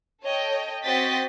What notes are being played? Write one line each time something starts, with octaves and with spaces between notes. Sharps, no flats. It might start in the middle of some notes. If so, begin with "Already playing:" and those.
A4 C#5 D#5 G5
C4 F#4 D#5 G5 A6 B6